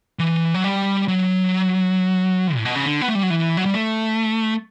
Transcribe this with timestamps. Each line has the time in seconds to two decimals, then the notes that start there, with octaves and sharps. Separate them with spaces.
0.19 E3
0.54 F#3
0.64 G3
1.08 F#3
2.56 A2
2.65 B2
2.75 C#3
2.86 D3
3.01 B3
3.08 A3
3.15 G3
3.23 F#3
3.30 E3
3.57 F#3
3.65 G3
3.74 A3